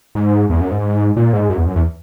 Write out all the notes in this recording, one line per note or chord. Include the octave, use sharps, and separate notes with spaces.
G#2
E2
F#2
G#2
A#2
G#2
F#2
E2
F#2
E2